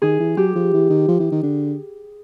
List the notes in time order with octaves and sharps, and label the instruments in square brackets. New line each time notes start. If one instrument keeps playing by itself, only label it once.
[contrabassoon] D#3 [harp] G#4
[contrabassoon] E3
[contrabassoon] F#3 [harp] G4
[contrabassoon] F3
E3
D#3
F3
E3
D#3
D3